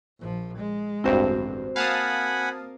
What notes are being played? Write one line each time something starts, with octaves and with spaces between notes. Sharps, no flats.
A#1 F3
G#3
A1 D2 G2 C4 F#4 C5
A#3 F5 F#5 G#5 A5 B5 D#6